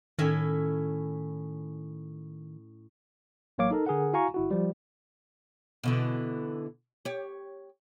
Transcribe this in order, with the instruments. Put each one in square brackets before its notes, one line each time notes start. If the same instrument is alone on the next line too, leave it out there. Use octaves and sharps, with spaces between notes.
[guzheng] A2 C#4 E4 [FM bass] D#3
[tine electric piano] A1 F#3 A#3 C#5 F5 D6
D#4 A4 A#4
D3 G#4 A#4 F#5
E4 F#4 F5 G#5 A#5 C#6
G1 E4 F#4
F3 G3
[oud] B2 D3 E3
G4 C#5